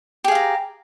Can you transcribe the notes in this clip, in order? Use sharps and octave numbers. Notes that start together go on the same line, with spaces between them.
G4 G#4 F5 A#5